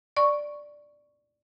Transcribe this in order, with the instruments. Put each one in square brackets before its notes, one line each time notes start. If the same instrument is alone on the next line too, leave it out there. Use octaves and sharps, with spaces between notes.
[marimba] D5 C#6